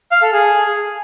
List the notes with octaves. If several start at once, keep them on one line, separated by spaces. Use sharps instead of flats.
F5
A4
G#4